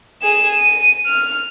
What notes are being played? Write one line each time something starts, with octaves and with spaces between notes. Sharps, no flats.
G#4 E7
D#7
F6